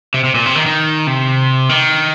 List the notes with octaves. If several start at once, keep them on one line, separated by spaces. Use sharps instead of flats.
C3
C3
A#2
C3
D#3
D#3
C3
D#3